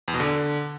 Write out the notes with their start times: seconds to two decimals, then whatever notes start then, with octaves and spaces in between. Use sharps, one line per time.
0.08 E2
0.14 B2
0.20 D3